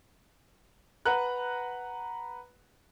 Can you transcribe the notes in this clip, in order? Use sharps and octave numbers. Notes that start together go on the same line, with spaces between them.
B4 F#5 A#5 F#6